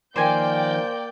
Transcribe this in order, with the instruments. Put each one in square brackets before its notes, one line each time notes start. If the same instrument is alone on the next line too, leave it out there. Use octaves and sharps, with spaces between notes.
[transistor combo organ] D#3 F3 [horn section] A#3 D5 [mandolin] C5 G#5 [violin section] G5 G6